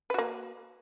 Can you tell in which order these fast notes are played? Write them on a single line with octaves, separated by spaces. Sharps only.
B4 F#4 A#3